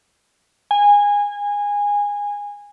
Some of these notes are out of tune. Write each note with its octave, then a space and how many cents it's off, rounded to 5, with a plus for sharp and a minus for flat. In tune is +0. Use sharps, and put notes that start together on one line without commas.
G#5 -20